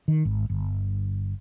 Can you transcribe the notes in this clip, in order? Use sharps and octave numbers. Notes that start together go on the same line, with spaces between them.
D#3
G#1
G1